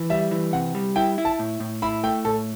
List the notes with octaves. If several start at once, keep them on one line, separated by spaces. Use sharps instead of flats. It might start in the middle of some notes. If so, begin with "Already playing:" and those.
Already playing: E3
G3 E5
E3
C3 F#5
G3
E4 G5
E4
A5
A2
A2
E4 B5
A3 G5
A2 A4